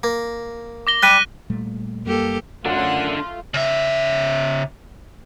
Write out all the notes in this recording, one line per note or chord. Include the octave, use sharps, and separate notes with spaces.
A#3
D6 A#6 G7
G3 D5 F#6 B6 D#7
A#2 G3 A3
F#2 G3 A#3 G4 A4
F#2 D3 A3 D4 F4 F#5
C#3 E5